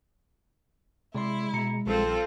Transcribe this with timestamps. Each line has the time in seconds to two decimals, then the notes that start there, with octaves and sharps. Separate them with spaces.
1.15 C3 G#3 E4 D5 C6
1.53 B2 A#5 C#7
1.86 A#1 G3 C4 F4 A4